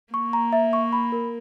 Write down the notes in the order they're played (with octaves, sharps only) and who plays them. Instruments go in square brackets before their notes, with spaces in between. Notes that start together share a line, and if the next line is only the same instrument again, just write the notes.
[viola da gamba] A#3 [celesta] C#6
[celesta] A#5
E5
C#6
B5
A#4